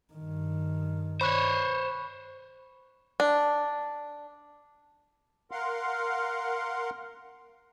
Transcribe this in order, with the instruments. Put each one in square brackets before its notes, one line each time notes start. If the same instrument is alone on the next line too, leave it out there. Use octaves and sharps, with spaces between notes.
[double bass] G2 D#3
[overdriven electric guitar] C5 C#5 [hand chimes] B5 C#6 F#6
[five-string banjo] D4
[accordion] A#4 F5 F#5 C6